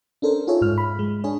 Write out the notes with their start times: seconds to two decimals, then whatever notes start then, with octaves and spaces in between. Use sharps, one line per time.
0.22 C#4 D4 A4 A#4 C5
0.47 D#4 F4 G#4 A4 C#5 E5
0.61 G#2 F6
0.78 B5
0.99 G#3
1.24 D4 G#4 C#5